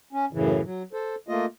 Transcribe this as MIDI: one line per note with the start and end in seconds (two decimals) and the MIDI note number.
0.13 0.25 61
0.33 0.61 42
0.33 0.61 45
0.33 0.61 49
0.33 0.61 52
0.64 0.83 54
0.93 1.15 69
0.93 1.15 72
1.28 1.46 57
1.28 1.46 58
1.28 1.46 65
1.28 1.46 75